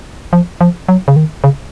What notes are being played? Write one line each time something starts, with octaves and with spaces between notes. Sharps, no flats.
F3
F3
F#3
C#3
D#3
C#3